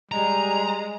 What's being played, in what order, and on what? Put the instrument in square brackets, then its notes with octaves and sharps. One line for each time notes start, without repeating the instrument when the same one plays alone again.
[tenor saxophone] G3 [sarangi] G#3 [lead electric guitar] A#5